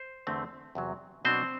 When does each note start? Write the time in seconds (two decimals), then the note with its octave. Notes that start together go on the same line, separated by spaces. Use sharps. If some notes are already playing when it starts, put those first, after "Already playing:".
Already playing: C5
0.27 E2 D3 A3 C4
0.75 E2 C3 F#3
1.25 B2 F#3 B3 C4 D4 C5